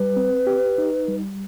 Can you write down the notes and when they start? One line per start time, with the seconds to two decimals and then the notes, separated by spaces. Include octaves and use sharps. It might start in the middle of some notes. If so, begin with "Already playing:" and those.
Already playing: G3 B4
0.16 C4
0.47 G4
0.78 D#4
1.08 G3